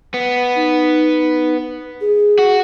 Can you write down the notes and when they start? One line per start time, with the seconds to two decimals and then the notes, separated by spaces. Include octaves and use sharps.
0.14 B3
0.55 D#4
2.01 G#4
2.39 F#4